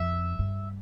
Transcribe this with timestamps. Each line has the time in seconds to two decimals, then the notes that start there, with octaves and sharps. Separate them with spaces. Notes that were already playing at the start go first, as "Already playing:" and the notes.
Already playing: F2 E5
0.39 G2